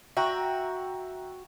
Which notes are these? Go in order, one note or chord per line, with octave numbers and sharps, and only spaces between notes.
F#4 E5 G5 A#5